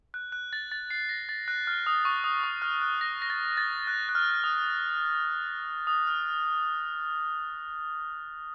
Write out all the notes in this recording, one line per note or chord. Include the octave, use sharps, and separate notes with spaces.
F#6
F#6
A6
A6
C7
A#6
A6
F#6
F6
D#6
C#6
D#6
C#6
F6
F#6
A#6
A#6
A6
A6
F#6
F#6
F6
D#6
D#6
F6